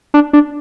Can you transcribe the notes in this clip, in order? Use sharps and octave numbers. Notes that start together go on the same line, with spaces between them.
D4
D4